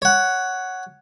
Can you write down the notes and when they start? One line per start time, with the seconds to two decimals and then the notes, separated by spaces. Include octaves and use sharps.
0.02 C#5 F#5